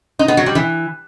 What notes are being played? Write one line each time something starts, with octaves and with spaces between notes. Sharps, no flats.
D#4
B3
F#3
G3
E3